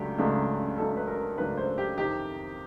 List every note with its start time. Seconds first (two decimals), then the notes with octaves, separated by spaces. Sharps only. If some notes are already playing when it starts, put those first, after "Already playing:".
Already playing: C#2 C#3 F#3 A3 D4 G4
0.18 C#2 C#3 F#3 A3 D4
0.78 C#2 C#3 F#3 A3 D4 A4
0.97 B4
1.08 A#4
1.38 C#2 C#3 F#3 A3 D4 B4
1.57 C5
1.78 G4
1.98 F2 C3 D#3 G4